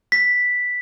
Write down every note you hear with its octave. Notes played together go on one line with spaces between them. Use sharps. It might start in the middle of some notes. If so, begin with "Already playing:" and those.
B6